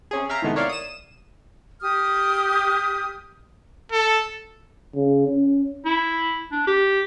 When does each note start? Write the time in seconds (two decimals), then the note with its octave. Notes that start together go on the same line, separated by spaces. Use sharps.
0.11 C3 C#4 G#4
0.29 E5 F5 G5 A#5
0.42 A2 C3 D#3 G#3 A3 B3
0.56 A#4 C#5 D5 E5 F5 C6
0.69 D#6 E7
1.81 G4 D#6 F6
3.92 A4
4.95 C#3
5.28 C#4
5.85 E4
6.52 D4
6.67 G4